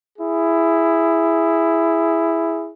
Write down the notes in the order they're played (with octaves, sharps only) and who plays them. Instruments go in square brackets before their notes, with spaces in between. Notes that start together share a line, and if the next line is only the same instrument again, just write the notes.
[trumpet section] E4 G#4